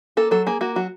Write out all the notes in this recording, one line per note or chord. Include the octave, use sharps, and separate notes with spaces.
A#3 A4
F#3 A4
A#3 G#4
A#3 F#4
F#3 F#4